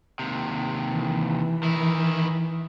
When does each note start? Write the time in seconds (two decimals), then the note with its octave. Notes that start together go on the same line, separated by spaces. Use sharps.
0.19 D#2 C3
0.92 E3
1.63 D#3 E4